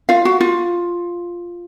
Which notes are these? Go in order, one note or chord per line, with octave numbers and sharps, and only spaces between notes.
F4 F5
F#4
F4